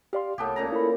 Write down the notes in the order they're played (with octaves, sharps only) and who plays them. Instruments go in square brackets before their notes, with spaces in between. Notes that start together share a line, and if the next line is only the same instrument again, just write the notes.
[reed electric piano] G4 D5 C6 [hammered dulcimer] F5
[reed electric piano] C2 A5 [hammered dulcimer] A2 B3 G4
[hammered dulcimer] A#2 C#3 A#5
[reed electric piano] E4 A4 B5